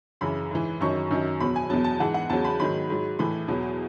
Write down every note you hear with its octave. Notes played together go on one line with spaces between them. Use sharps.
F#2 C#3 E3 B5
G#2 E3
F#2 D#3 F#3 C#6
F#2 D#3 F#3
E2 B2 F#3 B5
G#5
E2 B2 F#3 A5
A5
G#2 E3 F#5
F#5
E2 C#3 F#3 A5
B5
G#2 D#3 F#3 B5
G#2 F#3
A2 E3 B5
E2 B2 F#3